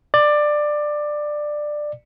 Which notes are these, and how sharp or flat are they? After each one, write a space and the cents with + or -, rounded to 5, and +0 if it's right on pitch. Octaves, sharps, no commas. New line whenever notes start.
D5 +15